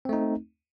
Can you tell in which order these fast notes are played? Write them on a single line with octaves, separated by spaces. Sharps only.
C4 A3 D#4